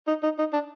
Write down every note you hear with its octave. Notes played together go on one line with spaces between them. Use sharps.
D#4
D#4
D#4
D4